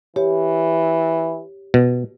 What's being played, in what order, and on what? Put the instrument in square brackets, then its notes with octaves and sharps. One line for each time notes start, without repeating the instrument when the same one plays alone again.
[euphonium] E3 [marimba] G4 C#5
[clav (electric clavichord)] B2